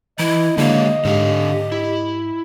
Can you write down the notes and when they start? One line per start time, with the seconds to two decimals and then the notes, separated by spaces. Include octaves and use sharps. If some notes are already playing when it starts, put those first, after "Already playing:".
0.19 E3 E4 D#5
0.58 D3 G#3 A#3 G4 C#5
1.05 G#2 D3 G4 F5
1.72 E4